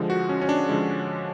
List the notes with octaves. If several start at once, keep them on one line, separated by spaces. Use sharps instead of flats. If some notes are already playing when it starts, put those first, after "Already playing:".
Already playing: D3 F3 G#3
F#4
C#4
C#4
D4
D3 F3 G#3